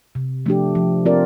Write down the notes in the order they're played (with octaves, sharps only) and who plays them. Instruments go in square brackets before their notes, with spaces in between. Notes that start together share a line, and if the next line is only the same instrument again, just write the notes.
[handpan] C3
F3 A3 D4 G4
F3
C4 F4 A#4 D5